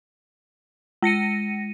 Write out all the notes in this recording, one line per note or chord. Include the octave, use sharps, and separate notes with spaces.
G#3 A#6 C#7 D#7